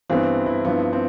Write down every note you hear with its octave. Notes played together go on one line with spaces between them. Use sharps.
G2 E3 B3 C4
E4
G2 F3 B3 C4
C4